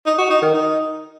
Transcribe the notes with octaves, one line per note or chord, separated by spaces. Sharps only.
D#4
F#4
D#4
D#3
D#4